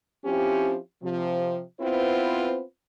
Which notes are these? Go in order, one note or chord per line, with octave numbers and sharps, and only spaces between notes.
F3 C4 C#4 E4 G4
C3 F3
B3 C4 E4 F4 B4 C5